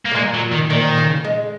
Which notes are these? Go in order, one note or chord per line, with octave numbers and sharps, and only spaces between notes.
A#3
C#3
A#2 G#3
F#3
D#3
A#2 D#3
C#3
G#3